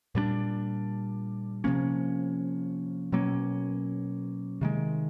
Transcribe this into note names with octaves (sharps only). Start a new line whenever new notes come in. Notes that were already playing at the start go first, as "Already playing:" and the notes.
A#2 G3 B3 D4
C3 F3 A#3 C#4
B2 F#3 A#3 C#4
C3 D#3 G#3